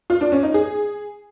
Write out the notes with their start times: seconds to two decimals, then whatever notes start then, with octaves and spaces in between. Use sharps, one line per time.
0.10 F4
0.21 D4
0.32 C#4
0.43 D#4
0.54 G#4